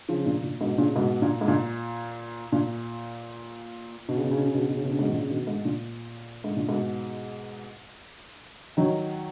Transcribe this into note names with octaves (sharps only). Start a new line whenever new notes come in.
C#3 F3
A#2
A#2
G#2 B2
A#2 C#3
G#2 B2
A#2
G#2
A#2
A#2
B2
C#3
B2
C#3
B2
C#3
B2
C#3
B2
C#3
B2
C#3
G#2 B2
D#3
A#2 C#3
B2 D#3
G#2
A#2
G#2
A#2
G#2 B2
D#3 F#3